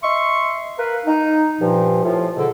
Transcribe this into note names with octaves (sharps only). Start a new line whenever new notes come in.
D#5 E5 C6 C#6
A#4 B4 F5
D#4
G2 A#2 F3
A2 F3 F4
G#2 B2 D3 A4